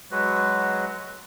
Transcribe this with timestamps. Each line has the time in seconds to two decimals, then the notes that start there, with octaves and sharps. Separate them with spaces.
0.11 F#3 G#3 F#4 B4